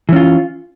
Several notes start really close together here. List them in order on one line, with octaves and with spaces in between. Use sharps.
E3 C#4 F4